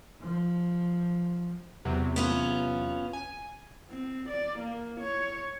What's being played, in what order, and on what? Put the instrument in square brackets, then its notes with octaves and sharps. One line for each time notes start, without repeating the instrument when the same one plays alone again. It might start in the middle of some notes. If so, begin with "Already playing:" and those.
[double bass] F3
[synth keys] E2 C3 F#3
[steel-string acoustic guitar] B3 C#4 F4
[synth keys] G#5
[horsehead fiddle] C4
D5
A#3
C#5